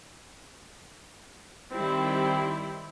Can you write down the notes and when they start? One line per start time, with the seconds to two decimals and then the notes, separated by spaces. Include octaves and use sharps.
1.71 D#3 G3 C4 E4